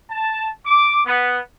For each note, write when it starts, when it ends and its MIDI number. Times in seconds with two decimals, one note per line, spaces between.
0.10 0.49 81
0.66 1.01 86
1.06 1.39 59